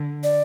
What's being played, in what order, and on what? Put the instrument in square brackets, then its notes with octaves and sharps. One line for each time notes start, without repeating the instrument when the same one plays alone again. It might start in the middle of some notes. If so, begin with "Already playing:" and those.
Already playing: [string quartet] D3
[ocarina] D5